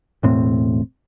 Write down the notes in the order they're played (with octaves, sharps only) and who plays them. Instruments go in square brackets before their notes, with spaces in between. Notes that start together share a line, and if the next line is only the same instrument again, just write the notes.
[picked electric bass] E1 A2 C4